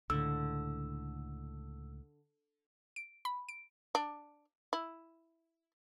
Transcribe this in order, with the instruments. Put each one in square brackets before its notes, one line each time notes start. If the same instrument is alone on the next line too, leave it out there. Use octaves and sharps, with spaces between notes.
[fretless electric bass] C#2 A2 [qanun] D3 [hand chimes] E6
[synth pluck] D7
B5
D7
[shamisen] D4
E4